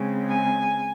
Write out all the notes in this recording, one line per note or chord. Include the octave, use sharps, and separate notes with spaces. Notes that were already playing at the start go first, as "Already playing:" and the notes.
Already playing: C#3 G#3 C4
G#5